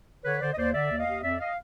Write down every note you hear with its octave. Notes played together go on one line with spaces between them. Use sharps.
D3 B4 C#5
D3 C5 D5
D#5
D#2 C5 D5
D3 D5 E5
D#2
D#5 F5
D#2
F2 D5 E5
D#5 F5